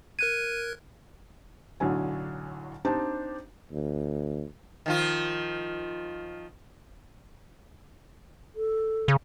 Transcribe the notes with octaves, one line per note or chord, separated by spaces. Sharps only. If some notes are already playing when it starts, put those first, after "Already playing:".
A#4 F#6 G#6 D#7
B1 A2 D3 F#3 G#5
C4 D4 D#4 G4 A5
D2
D#3 F3 F4
A4
C#3